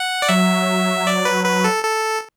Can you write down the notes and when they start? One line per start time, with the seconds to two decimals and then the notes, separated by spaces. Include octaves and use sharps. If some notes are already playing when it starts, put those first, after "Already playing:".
Already playing: F#5
0.22 D5
0.29 F#3 E5
1.07 D5
1.25 B4
1.44 B4
1.64 A4
1.83 A4